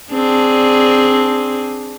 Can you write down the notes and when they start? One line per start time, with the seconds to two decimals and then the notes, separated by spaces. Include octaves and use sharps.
0.13 C4 D4 G#4